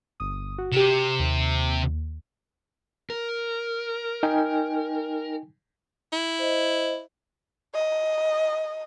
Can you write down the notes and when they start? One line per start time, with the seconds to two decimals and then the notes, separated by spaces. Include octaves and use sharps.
0.20 G1 D#6
0.58 F#4
0.73 C3 G4 D#7 E7
1.19 D#2
3.10 A#4
4.23 D#4 G5 G#5
6.12 E4
6.39 C5 D#5
7.74 D#5